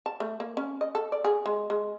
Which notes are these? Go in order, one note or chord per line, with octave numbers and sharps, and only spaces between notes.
A5
A3
A#3
C#4
D#5
A4
D5
G#4
G#3
G#3